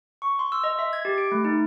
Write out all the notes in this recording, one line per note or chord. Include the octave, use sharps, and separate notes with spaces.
C#6
C6
E6
D#5
E5
G#6
G4
D7
A3
D#4